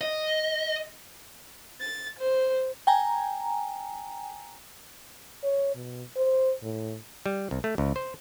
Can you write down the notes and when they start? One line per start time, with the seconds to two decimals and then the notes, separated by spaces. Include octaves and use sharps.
0.01 D#5
1.81 A6
2.19 C5
2.87 G5 G#5 A#5
5.43 C#5
5.75 B2
6.17 C5
6.63 A2
7.26 G3
7.51 C2
7.64 A3
7.78 C#2
7.96 C5